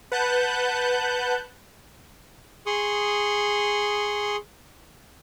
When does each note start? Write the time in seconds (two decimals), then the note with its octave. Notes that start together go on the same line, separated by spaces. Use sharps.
0.12 B4 F#5 A5 F#6 G6
2.66 G#4 C6 C#6 D#6